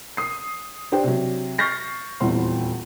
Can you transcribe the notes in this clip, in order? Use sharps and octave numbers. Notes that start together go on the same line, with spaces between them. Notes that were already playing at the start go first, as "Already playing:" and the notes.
D#6 C7
D4 G4 C5 D5 G5
C3 F#3
C#6 F6 G6 A6 A#6 C7
D#1 E2 E3 G3 C4 C6